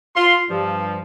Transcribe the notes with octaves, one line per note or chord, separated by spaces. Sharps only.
F4 C6
G2 F3